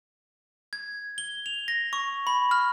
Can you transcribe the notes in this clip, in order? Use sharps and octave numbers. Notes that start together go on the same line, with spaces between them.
G#6
G7
F7
A#6
C#6
B5
F6